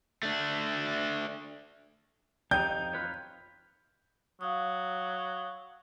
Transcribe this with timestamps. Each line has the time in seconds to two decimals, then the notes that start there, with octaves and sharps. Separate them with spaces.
0.23 A3 D4
2.51 F2 D#4 G4 G5 G6
2.93 F4 B4 C#5
4.41 F#3 F5 D#6